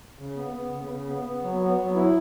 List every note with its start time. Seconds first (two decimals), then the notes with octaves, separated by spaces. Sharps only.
0.19 C#3
0.37 B3
0.54 B3
0.72 C#3
0.90 C#3
1.07 B3
1.25 B3
1.43 F#3
1.60 B3
1.78 F#3
1.96 E4